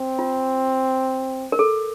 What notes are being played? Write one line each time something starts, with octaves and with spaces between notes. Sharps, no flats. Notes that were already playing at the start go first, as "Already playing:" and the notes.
Already playing: C4
F4
A#4
A4